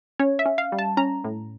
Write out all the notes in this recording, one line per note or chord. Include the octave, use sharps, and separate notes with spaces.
C#4 C#5
E5
C#4
F5
G3
A5
C#4 A#5
A2